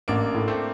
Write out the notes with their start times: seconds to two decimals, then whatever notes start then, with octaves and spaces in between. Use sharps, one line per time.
0.08 A1 A#3 D4
0.34 A2
0.48 A3 C4